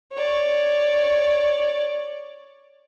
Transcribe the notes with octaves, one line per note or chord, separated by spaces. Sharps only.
C#5 D5